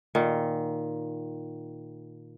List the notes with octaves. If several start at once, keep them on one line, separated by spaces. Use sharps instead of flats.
A#2 D#3